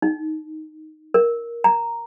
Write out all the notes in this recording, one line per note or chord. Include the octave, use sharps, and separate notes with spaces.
D#4
A#4
A#5